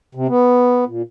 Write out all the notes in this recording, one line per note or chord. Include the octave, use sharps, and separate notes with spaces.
C3
B3
A#2